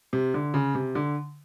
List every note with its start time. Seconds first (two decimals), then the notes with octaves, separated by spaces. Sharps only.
0.13 C3
0.34 D3
0.54 C#3
0.75 C3
0.95 D3